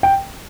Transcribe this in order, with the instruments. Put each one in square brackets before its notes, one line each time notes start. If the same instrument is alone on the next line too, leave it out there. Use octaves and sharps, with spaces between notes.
[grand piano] G5